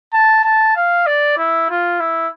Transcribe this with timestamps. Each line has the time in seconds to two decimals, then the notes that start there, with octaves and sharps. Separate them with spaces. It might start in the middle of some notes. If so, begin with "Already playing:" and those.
0.13 A5
0.44 A5
0.76 F5
1.06 D5
1.37 E4
1.70 F4
2.00 E4